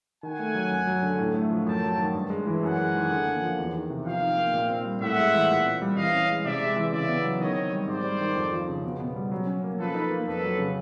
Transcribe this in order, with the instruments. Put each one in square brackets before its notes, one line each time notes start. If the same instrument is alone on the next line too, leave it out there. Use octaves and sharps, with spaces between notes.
[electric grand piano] D#3 [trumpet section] F#5 G#5
[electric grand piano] A3
F#3
F#2
F#3
D3
A2
A3
F3
[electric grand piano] F#2 [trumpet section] G5 A5
[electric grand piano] F#3
D#3
G2
G#3
E3
[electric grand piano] F#2 [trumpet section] F#5 G#5
[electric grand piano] G#3
D#3
D3
A#3
F3
E2
D#3
C3
[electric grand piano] F3 [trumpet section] F5 G5
[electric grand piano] D#4
A#3
A#2
C4
G3
[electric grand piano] A2 [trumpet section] E5 F#5
[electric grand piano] G#3
E3
A#2
C4
G3
[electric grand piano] E3 [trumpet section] D#5 F5
[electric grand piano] C#4
G#3
[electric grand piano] C3 [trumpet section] D5 E5
[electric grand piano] G#3
E3
[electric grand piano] C#3 [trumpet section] D5 E5
[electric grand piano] B3
F#3
[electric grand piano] D#3 [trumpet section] C#5 D#5
[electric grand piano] C4
G3
[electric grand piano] G#2 [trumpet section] C5 D5
[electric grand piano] G3
D#3
F2
F3
C#3
B2
B3
G3
F#3
C#4
A#3
[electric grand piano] F3 [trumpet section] A4 B4
[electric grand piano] D#4
A#3
[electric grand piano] F2 [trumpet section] A4 B4
[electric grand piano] F#3
C#3